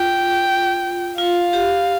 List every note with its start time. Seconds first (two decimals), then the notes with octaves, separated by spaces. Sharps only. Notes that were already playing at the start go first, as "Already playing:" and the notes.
Already playing: F4 G5
1.18 F4 F5
1.53 G4